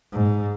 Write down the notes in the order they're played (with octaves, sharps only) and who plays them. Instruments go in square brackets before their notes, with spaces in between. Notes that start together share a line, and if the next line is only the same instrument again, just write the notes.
[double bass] G#2